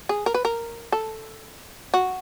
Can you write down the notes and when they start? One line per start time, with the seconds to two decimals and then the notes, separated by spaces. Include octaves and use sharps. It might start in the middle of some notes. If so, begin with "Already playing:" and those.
0.09 G#4
0.26 A#4
0.34 B4
0.45 A#4
0.92 A4
1.94 F#4